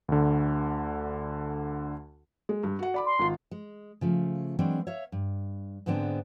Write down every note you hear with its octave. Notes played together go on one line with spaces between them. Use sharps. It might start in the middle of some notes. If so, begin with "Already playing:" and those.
D2 D3
G#3
G2
F#4 F#5
D5 B5 D6
C6
G#1 F4
G#3
C#3 F3 A3
E3 F#3 G#3 C4 D4
C#5 E5 F5
G2
G#2 D3 G#3 B3 C4 D4